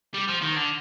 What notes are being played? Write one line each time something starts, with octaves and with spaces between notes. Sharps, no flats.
G3
F3
D#3
D3